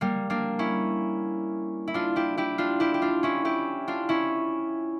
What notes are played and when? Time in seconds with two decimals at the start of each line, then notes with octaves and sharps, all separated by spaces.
0.01 G3 A#3
0.30 A#3 D4
0.59 C#4 E4
1.88 E4
1.94 D4 F4
2.16 E4 G4
2.37 E4 G4
2.58 D4 F4
2.80 E4 G4
2.94 G4
3.02 D4 F4
3.23 C#4 E4
3.45 E4 G4
3.88 D4 F4
4.09 C#4 E4